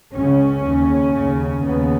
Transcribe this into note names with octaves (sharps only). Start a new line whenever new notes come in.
C#2 C#3 C#4
D#2 C#3
D#2 C#3
D#2 C#3 B3